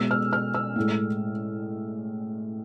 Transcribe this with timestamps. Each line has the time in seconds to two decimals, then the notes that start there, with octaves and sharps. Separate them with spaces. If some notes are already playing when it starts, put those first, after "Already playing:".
Already playing: B2 G#3 E6
0.11 F6
0.33 F6
0.55 E6
0.76 A2 G#3